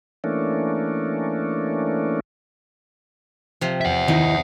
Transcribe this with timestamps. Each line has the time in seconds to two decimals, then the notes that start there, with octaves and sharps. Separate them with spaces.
0.24 E3 A3 A#3 C#4 D4
3.61 C3 F3
3.81 E5 F#5
4.08 D#3 D#4 E4 D#5